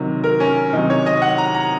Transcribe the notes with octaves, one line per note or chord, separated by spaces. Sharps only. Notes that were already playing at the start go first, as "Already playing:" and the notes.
Already playing: C3 D#3 F#3
A#4
C#4
C3 D#3 F#3 D#4
C#5
D#5
F#5
A#5
A#5